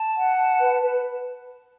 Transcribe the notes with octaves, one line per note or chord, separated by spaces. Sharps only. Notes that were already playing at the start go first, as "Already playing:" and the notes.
Already playing: A5
F#5
A5
B4
B4